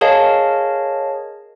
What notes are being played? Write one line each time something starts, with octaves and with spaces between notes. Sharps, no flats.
G#4 A#4 C#5 D#5 F5 A5